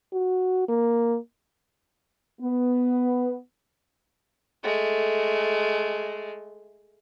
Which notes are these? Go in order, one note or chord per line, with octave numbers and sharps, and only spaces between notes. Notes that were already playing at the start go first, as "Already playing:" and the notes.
F#4
A#3
B3
G#3 A3